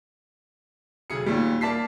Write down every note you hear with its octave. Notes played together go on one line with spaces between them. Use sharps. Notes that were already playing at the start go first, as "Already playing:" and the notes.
F1 F#3 G#4 C#7
D#2 A#2 G3
A#3 D5 A5 B6 C7